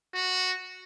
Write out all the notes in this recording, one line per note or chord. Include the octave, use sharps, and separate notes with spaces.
F#4